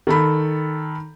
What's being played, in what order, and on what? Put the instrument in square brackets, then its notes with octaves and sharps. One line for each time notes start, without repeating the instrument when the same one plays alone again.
[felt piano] D#3 A4 B5